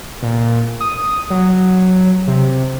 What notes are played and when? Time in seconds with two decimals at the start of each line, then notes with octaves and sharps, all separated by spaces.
0.23 A#2
0.80 D#6
1.30 F#3
2.27 C3